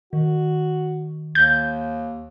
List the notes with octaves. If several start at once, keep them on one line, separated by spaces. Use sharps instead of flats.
D#3 F#4
D#2 G6